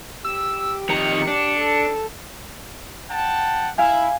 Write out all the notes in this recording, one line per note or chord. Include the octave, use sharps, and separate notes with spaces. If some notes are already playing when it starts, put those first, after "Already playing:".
G4 E6
F2 D#3 A#5 C#7
D4
A4
F#5 G5 A5
E4 F5 G#5 G#6